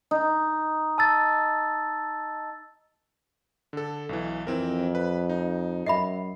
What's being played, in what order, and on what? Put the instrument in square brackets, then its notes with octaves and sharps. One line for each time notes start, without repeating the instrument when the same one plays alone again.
[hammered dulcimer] D#4
[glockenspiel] A5 E6 A6
[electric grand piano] D3 A4
B1 E3
[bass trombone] F2 [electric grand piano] E3 C4 A#4
[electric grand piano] B4
D#4
[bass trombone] F#2 [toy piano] D#5 E5 B5 [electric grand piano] C7